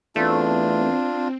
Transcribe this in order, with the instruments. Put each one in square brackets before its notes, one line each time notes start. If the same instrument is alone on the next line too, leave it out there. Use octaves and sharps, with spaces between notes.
[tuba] E2 [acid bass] A3 [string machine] C4 [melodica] D4 F4